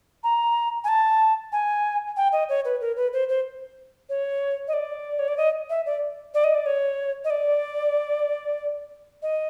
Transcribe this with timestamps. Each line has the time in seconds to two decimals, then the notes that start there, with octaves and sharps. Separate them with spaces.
0.24 A#5
0.84 G#5
0.88 A5
1.52 G#5
2.17 G5
2.32 D#5
2.49 C#5
2.65 B4
2.81 A#4
2.96 B4
3.13 C5
3.29 C5
4.09 C#5
4.68 D#5
4.73 D5
5.19 C#5
5.28 D5
5.37 D#5
5.70 E5
5.86 D5
6.34 D5
6.44 D#5
6.55 D5
6.66 C#5
7.24 D#5
7.30 D5
9.22 D#5